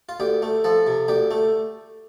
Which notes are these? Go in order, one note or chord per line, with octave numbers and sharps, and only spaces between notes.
F4
D2 G4
A3
F3 A4
C3
D2 G4
A3